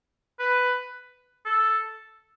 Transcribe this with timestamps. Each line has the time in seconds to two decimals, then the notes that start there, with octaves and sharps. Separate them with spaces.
0.39 B4
1.46 A4